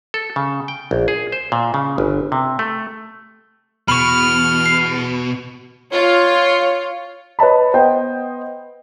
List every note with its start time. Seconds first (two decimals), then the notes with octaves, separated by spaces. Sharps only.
0.14 A4
0.36 C#3
0.68 G5
0.91 A#1
1.08 G#4
1.32 C5
1.52 A#2
1.74 C#3
1.98 G1
2.32 C3
2.59 A3
3.88 E2 B2 B5 C#6 F6
4.66 C7
5.92 F4 C#5
7.39 B4 C#5 D#5 A5 B5
7.73 B3 C5 D#5 G5